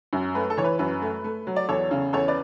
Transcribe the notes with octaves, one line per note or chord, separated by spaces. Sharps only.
F#2
A3 B4
A4
E3 C#5
B4
F#2 B4
A3
A3
F#3
D5
E2 A4 C#5
C#3
E2 A4 C#5
B4 D5